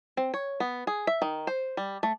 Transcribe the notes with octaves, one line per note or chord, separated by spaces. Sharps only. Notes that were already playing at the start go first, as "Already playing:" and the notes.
C4
C#5
B3
G#4
E5
D#3
C5
G3
A3